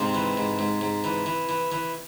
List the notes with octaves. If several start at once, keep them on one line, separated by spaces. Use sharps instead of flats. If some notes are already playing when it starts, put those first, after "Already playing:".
Already playing: G#2 C3 C4
E3
G#2
G#2
G#2
E3
E3
E3
E3